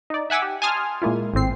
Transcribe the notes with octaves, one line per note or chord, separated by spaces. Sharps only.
D#4 D5
E5 F#5 G#5 D6 E6
G4
G#5 A5 C6 D#6 F6
A#2 G#3 A#3 E4 F4
G#1 A2 C4 C7